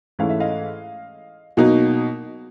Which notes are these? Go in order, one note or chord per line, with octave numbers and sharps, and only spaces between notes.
G#2 E3 A3 C#4 E4 F5
E5
D#5 F5
B2 F#3 A#3 D#4